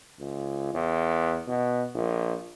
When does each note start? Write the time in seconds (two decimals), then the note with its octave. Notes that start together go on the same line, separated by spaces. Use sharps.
0.20 C#2
0.74 E2
1.48 B2
1.95 A#1